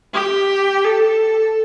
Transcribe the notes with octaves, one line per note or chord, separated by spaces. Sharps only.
G4
A4